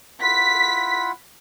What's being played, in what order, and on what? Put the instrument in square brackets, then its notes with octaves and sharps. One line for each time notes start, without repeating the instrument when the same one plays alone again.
[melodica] E4 F4 F#5 [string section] B6